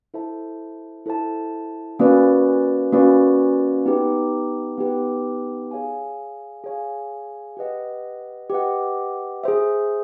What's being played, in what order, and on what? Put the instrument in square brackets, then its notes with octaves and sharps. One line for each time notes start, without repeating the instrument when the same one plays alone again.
[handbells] E4 A4 C5 E5 A5
E4 A4 C5 E5 A5
A#3 C#4 F#4 B4 D5
A#3 C#4 F#4 B4 D5
B3 D#4 G4 B4
B3 D#4 G4 B4
G#4 C#5 F5 G#5
G#4 C#5 F5 G#5
G4 B4 D#5 F#5
G4 B4 D#5 F#5
G#4 C5 E5